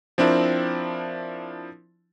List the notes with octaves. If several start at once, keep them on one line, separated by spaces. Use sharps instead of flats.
F3 C4 D4 E4 A#4